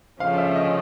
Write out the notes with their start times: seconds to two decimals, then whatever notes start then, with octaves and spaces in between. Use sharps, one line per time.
0.20 C#3 F3 A3 C#4 F5
0.38 E5
0.56 D#5